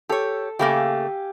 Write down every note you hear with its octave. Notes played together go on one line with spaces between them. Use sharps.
G4 A4 C#5
C#3 A3 A#3 G4 F5 G#5